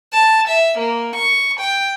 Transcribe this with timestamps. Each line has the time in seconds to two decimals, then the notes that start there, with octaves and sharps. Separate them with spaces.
0.12 A5
0.48 E5
0.78 A#3
1.16 C#6
1.59 G5